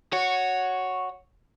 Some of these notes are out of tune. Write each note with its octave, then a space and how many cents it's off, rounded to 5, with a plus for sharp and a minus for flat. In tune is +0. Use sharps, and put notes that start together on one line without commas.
F#4 -5 C#5 +0